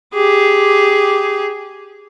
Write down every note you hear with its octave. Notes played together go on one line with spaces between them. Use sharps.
G4 G#4